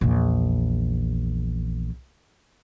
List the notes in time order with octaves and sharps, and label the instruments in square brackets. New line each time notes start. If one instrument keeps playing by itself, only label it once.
[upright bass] A#1 E2